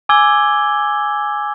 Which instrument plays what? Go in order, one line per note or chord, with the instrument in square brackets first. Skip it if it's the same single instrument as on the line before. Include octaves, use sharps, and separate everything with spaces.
[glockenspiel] G#5 D6 E6 G#6 G7